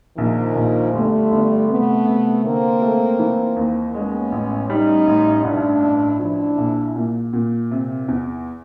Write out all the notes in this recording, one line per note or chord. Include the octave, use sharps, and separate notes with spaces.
A#1 D#3 F3
A#1
G1 G3 A3
G1
C3 A3 B3
C3
D3 A#3 C4
A3
E3
D#2
G#3 B3 C#4
A1
G3 C#4 D#4
A1
G2 D4 E4
A1
F3 D4 E4
A#1
A#2
A#2
C3
E2